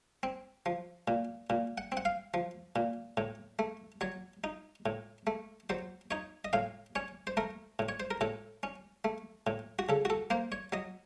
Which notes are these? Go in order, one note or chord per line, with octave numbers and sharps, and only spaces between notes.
C4
F3
A#2
A#2
F#5
C4
F#5
F5
F3
A#2
A2
A3
F#3 C#5
D#4
A2
A3
F#3 C5
D#4 C#5
D#5
A2 F5
C#4 C#5
C5
A3 A#4
A2
C#5
C5
A#4
A2 A4
C#4
A3
A2
F#4
C#3 A4
F#4
A4
A#3 C5
C#5
F#3 D#5